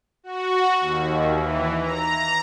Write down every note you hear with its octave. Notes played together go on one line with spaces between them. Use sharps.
F#4
D#2
E3
A#5